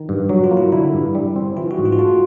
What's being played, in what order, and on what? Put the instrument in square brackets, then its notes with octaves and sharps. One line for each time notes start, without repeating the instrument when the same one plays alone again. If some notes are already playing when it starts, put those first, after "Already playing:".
Already playing: [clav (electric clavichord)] D#3
G2
[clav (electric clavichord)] F#3 [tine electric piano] F#4
[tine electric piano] F4
[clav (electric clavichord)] A#3
[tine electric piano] E4
[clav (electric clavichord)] D3 [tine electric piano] E4
[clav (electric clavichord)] G2
G3
C4
[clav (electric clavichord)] E3 [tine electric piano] F4
[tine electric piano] F#4
[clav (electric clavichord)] G#2
[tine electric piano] F4
F#4
[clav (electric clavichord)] A3 [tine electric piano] F4